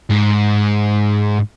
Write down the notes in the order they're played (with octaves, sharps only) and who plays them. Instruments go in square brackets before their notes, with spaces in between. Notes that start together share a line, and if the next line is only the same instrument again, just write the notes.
[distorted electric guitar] G#2